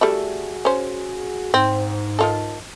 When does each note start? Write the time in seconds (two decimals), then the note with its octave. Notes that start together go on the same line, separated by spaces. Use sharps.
0.01 G3 A3 E4 F#4 G#4
0.65 C#4 C5
1.54 G#2 C4
2.19 D#3 F4 A4